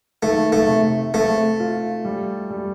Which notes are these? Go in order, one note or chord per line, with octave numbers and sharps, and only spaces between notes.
D#3 A3
A3
C3
A3 C4
F4
G3
G3